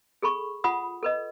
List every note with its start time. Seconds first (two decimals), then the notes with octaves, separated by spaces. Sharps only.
0.22 G#4 A4 B5 C#6
0.64 F4 F#5 B5 D#6
1.03 A4 B4 D#5